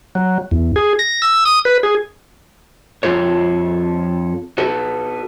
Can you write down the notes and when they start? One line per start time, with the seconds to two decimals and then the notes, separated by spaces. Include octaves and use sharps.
0.15 F#3
0.51 E2
0.76 G#4
0.99 A#6
1.22 E6
1.45 D#6
1.65 B4
1.83 G#4
3.03 F2 F4 A4 C#5
4.58 F#4 A4 B4